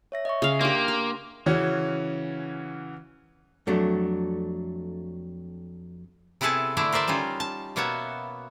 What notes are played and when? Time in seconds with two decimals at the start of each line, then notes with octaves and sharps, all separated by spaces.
0.12 C#5 E5 A#6
0.25 D#5 E5 C#6
0.42 C#3 F5
0.61 A#3 D4 G4 C6 D6
0.88 A#5
1.46 C#3 E3 C#4 F#4
3.67 F2 F#3 A3 D4
6.41 C3 B3 E4 G#4 A4 A5
6.77 D3 A3 D4 E4
6.92 A#4 C5 D5 E5 A5
7.07 G3 C#4 D#4 F4
7.40 A5
7.76 B2 A#3 B3 F#4 C#5 E5